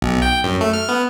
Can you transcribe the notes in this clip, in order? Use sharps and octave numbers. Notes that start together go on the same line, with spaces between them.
B1
G5
F#2
A3
F6
B3